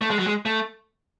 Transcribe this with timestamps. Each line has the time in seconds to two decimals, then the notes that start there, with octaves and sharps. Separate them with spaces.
0.01 A3
0.10 G#3
0.19 F#3
0.27 G#3
0.46 A3